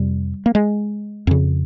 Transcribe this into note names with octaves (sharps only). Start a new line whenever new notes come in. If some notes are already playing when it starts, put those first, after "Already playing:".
Already playing: F2 C3 G3
A#3
G#3
F2 C#3